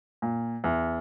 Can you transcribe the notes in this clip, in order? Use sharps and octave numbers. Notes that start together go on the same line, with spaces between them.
A#2
E2